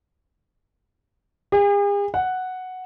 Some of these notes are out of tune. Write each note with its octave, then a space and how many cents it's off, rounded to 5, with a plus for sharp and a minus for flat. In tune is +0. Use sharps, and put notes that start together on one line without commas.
G#4 -45
F#5 +0